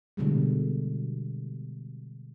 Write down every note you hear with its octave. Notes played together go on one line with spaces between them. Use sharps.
B2 D3 G3 G#3